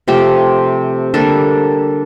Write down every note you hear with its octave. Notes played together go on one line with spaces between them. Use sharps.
C3 F3 A3 C4 G4
D3 G3 A#3 D4 A4